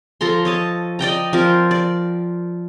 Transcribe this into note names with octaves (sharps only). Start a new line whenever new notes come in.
F3 A4 A#5 C6
C#5 D#5 A5
D5 D#5 G5 A#5
F3 C4 A#4
D5